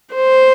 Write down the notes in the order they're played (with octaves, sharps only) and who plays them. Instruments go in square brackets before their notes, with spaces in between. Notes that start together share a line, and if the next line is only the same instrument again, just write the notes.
[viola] C5